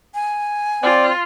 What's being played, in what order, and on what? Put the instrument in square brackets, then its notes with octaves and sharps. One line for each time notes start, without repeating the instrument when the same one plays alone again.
[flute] G#5
[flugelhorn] C4 [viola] F4 [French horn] D5